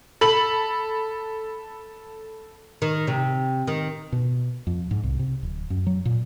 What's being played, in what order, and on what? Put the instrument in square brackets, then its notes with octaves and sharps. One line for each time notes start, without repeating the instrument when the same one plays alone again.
[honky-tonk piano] A4 B5 F#7
[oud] D#3
C3
D#3
[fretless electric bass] B2
F2
G#2
C2
C3
D1
F#2
F#3
A#2